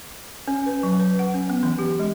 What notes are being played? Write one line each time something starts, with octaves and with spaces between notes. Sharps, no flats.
C#4
B4
F#3
B4
F#5
C#4
B3
E3
G4
G#3